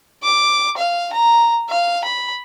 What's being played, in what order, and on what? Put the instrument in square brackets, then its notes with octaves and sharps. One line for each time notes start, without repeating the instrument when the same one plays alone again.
[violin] D6
F5
A#5
F5
B5